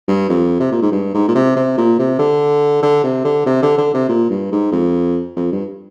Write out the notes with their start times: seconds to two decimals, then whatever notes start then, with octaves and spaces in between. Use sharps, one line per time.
0.08 G2
0.29 F2
0.60 C3
0.71 A#2
0.82 G#2
0.92 G2
1.14 G#2
1.28 A#2
1.35 C3
1.56 C3
1.77 A#2
1.99 C3
2.19 D3
2.82 D3
3.03 C3
3.24 D3
3.46 C3
3.62 D3
3.78 D3
3.94 C3
4.09 A#2
4.30 G2
4.52 G#2
4.72 F2
5.36 F2
5.52 G2